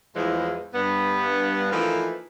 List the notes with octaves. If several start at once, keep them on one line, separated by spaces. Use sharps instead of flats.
E2 A2 E3 F3 G#3
G2 B3
E3 F3 A3 A#3 D#4 F4